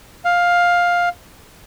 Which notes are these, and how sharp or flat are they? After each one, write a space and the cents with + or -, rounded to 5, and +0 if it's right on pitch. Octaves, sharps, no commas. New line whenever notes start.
F5 +10